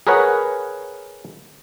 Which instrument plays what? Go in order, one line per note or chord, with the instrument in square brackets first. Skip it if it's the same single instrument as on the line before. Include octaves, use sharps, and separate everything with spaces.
[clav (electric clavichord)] G#4 A#4 B4 C#5 F#5